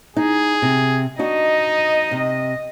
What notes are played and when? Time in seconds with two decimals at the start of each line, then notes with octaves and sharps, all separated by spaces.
0.17 D#4 G#4
0.62 C3
1.19 D4 D#4 F#4 D#5
2.11 C3